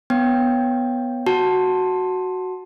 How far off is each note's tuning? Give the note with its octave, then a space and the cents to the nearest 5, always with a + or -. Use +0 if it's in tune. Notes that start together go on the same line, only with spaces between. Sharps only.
B3 +0 C#5 +0 G5 +0
F#4 +0 A5 +5